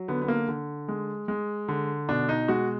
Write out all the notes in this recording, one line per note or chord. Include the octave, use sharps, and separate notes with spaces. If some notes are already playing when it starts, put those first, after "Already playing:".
Already playing: F#3
D3 B3
B3
A#3
D3
G#3
G#3
D3
B2 D4
D#4
G#3 F#4